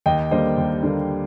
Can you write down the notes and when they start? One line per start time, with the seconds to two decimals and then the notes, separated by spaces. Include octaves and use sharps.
0.06 D#2 D#5 G5
0.31 D3 G3 A#3 C5 D#5
0.58 D#2
0.83 D3 G3 A#3